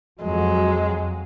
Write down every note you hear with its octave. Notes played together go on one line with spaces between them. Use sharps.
F2 F#3 G#3